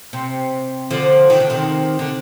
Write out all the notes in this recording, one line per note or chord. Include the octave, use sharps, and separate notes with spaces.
C3
D3 F3
D#3
D3
C3 D#3
D3